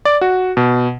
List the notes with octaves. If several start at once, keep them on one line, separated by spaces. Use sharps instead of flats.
D5
F#4
B2